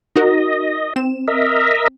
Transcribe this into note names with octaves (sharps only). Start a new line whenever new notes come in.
D#4 F#4 A#4 D#5
C4 E7
A#4 D#5 E5